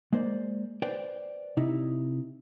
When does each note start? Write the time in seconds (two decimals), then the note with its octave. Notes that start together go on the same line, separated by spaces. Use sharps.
0.13 G#3 A#3 C5 D5
0.82 B4 C5 D5 G5
1.57 C3 D#4 E4